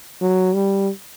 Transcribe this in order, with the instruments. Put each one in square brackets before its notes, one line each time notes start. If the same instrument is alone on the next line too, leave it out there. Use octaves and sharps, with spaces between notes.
[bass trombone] F#3
G3